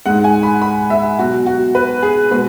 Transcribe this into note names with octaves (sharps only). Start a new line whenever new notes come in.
G#2 G#3 F#5
G#5
B5
B5
E5
B2 F#3 F#4
F#4
B4
G#4
B2 G#3 B4